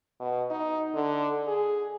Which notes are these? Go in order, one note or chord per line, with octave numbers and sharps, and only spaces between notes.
B2
D#4
D3
G#4